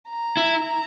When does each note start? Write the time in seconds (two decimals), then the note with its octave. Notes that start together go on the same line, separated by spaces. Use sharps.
0.09 A#5
0.37 E4